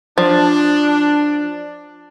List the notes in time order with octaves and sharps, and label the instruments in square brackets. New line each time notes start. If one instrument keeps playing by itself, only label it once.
[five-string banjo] F3 [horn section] D4